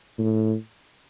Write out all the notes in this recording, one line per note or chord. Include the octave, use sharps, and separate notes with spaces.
A2